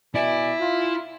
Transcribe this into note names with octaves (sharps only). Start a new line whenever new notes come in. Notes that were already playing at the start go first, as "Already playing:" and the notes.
B2 E4 D5 G#5
F4